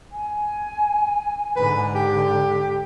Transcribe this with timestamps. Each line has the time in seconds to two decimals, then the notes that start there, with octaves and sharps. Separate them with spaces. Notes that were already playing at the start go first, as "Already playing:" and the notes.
0.12 G#5
1.56 G#2 D3 B4
1.95 G4